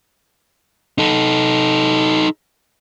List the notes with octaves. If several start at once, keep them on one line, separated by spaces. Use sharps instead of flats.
D#4 A4